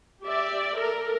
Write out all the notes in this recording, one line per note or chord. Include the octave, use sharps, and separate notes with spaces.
G4 D5 E5
A4 A#4